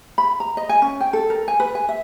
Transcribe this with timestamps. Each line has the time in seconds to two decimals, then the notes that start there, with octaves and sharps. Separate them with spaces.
0.18 B5
0.40 A#5
0.57 D#5
0.69 G#5
0.82 C#4
1.00 G5
1.13 A4
1.30 A#4
1.48 G#5
1.60 B4
1.75 G#5
1.89 E5